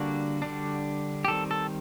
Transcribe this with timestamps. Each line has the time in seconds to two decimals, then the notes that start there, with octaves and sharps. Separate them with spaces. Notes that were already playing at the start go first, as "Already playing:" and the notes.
Already playing: D3 G3 A#3 D4 F#4
0.42 D3 G3 D4
1.25 G4
1.28 D#3 G3 C4 A4
1.51 A4